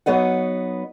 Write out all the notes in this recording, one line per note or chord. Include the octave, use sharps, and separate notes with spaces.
F#3 B3 D#4 F#5